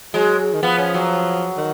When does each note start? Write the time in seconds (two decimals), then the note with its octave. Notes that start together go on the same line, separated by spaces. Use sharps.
0.14 F#3 G#3
0.54 D#3
0.62 F3 B3
0.78 C#4
0.94 F#3
1.57 D#3